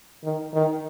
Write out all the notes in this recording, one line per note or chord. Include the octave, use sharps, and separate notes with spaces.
D#3
D#3